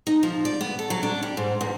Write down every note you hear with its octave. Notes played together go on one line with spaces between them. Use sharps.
D#4
F3
D5
B3
A4
F#3
D4
G3
G#2
E2